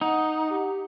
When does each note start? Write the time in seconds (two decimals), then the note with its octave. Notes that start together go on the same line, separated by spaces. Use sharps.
0.01 D#4 F#5
0.51 G4